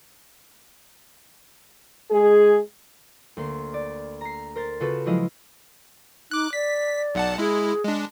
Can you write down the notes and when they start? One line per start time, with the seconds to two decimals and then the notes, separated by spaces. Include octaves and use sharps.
2.11 G#3 G#4
3.37 D2 A#3 C6
3.74 D5
4.21 A#5 C7
4.56 A#4 C5 A6
4.80 C#3 F4 F#4 A4 B4
5.06 F3 F#3 G#3 E4 D#5 F5
6.31 D#4 D6 F#6
6.53 D5 B6
7.15 B1 F#5 A5
7.38 G#3 E4 G#4
7.84 G#3 D4